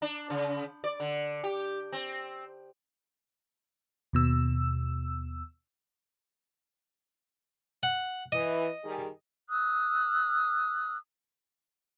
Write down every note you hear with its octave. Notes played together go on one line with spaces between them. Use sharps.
D4
C#3
D5
D3
G4
C4
D#2 B2 E6
F#5
E3 D#5
D#3 G3 G#4
D#6 E6 F#6